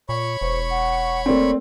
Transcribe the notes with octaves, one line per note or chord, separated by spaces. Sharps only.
A#2 C#5 B5 C#6
E1 C5
F#5
A3 A#3 C4 D5